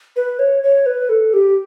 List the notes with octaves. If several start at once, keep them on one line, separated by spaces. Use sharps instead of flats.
B4
C#5
C#5
B4
A4
G4